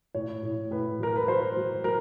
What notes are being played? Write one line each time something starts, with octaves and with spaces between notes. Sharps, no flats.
A2 C#5
A2
A2 B4
F#3 A#4
B4
F#3 C5
F#3
F#3 A#4